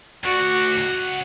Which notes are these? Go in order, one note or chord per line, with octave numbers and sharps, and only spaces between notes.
D2 F#4 D5
C#2 F#5